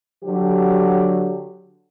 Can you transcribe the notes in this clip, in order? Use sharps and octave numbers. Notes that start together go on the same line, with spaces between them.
D3 F#3 G4